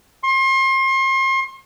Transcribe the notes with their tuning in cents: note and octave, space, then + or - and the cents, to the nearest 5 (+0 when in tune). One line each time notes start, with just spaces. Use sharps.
C6 +35